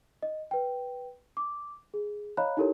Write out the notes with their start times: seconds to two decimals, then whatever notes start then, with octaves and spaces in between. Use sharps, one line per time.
0.22 D#5
0.51 B4 G5
1.37 D6
1.94 G#4
2.37 C#5 D#5 F5 A#5 B5 F#6
2.57 D#4 E4 G4 A4 A#4 C#5